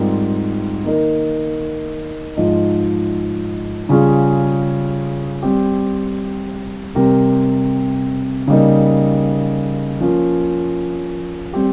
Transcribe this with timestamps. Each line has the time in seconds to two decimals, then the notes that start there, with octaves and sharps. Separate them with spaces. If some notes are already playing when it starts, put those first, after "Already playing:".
Already playing: G#2 G3 C4 F4 A#4
0.84 D#3 A#3 D#4 A#4
2.36 G#2 F3 G#3 D#4
3.89 C#3 G3 C#4 F4 G#4
5.42 G3 C4 G4
6.95 C3 G3 C4 G4 A#4
8.47 C#3 G3 A#3 D#4
10.01 F3 A#3 C#4
11.53 G3 C4 G4